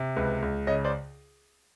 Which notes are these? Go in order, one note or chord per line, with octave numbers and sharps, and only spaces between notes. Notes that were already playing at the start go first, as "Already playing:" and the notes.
Already playing: C3
C#2 B4
C#2
C#3 C#5 D#5
C5 D5